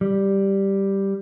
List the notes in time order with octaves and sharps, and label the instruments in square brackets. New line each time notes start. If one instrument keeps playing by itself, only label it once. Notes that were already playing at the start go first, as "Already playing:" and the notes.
[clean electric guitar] G3